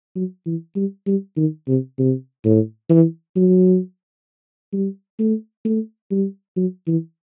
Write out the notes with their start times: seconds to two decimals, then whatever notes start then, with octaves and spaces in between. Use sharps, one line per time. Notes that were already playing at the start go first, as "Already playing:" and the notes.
0.15 F#3
0.46 E3
0.76 G3
1.07 G3
1.37 D#3
1.68 C3
1.99 C3
2.45 A2
2.90 E3
3.36 F#3
4.73 G3
5.20 A3
5.65 A3
6.11 G3
6.57 F#3
6.87 E3